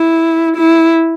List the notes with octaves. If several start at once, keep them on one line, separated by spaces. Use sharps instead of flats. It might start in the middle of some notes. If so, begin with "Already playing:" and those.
Already playing: E4
E4